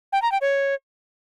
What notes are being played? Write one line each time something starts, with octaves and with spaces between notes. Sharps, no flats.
G5
A#5
G5
C#5